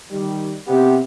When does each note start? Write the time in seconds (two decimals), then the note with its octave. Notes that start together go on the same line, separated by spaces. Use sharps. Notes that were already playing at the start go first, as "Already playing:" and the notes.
0.10 D#3 G3
0.67 C3 B3 C4 G4